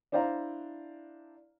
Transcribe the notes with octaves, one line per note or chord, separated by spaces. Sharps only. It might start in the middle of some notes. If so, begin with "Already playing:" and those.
D4 E4 C5 D5 F5 A#5